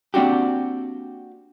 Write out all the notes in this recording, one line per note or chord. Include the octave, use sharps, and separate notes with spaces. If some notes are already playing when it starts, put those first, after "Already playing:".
A#3 C4 D4 F#4 G4